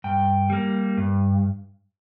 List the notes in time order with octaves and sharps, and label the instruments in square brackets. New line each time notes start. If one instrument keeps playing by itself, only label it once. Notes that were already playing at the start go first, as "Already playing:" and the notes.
[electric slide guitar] G2 G5
G3 A#3
G2